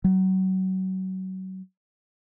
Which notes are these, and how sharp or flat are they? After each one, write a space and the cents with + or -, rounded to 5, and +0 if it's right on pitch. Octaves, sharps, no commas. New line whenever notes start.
F#3 +30